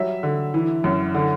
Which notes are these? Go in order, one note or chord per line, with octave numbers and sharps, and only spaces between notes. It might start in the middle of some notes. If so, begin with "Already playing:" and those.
Already playing: F#3 G3 E5
D3
E3
F#2
D3